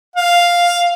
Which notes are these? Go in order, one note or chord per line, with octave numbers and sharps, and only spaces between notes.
F5